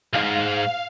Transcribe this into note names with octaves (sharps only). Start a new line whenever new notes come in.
B1 G#2 F5